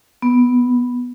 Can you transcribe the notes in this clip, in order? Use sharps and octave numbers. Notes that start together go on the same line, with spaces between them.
B3